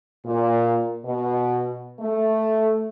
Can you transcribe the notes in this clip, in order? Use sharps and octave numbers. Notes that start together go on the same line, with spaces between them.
A#2
B2
A3